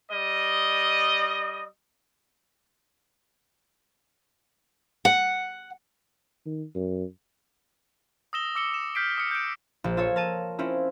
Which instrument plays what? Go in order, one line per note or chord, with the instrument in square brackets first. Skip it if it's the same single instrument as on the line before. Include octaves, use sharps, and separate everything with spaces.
[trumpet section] G3 D#5
[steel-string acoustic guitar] F#5
[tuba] D#3
F#2
[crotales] D#6 E6 A#6 E7 G7
D6 E6 C#7 E7 G7
E7
F6 G6 B6 C7 D7
D#6 F6 C#7
G6 D7
[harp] A#1
F4 A4 C#5
A#4 A5 D#7
C4 C#4 E4 F4